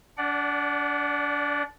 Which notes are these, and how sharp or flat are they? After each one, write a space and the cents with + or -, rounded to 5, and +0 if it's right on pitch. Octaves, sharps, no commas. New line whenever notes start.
D4 -30 D5 +0 F#5 +15